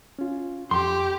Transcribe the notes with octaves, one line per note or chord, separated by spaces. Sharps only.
C#4 F4
F2 G4 C6